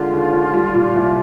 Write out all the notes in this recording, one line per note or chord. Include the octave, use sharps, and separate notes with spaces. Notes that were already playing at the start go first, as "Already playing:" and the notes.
Already playing: D3 G#3 F4
D#2
D#2
G3
A#2
C2